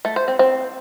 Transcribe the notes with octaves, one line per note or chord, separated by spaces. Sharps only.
A3
C5
C4
C4